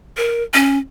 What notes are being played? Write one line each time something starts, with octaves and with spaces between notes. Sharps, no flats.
A#4
C#4